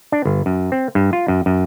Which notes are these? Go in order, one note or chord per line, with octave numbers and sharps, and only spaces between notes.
D4
G1
F#2
C4
G2
F4
F#2
F#2